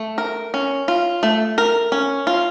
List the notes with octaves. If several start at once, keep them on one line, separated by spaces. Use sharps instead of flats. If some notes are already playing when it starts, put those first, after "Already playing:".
Already playing: A3
A#4
C#4
F4
A3
A#4
C#4
F4